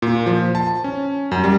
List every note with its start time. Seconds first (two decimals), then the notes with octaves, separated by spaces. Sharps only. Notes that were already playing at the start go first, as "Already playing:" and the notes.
0.02 A#2
0.26 F3
0.55 A5
0.84 C#4
1.32 F#2
1.44 G3